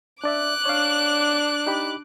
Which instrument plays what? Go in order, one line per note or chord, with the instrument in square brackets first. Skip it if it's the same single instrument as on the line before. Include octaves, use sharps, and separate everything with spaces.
[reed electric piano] D4 D5 E5 [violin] D6 F#6
[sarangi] D4 [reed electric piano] C#5 F5
[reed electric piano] D#4 G4 B5